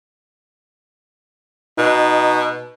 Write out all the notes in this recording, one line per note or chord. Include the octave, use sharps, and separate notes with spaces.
B2 D#4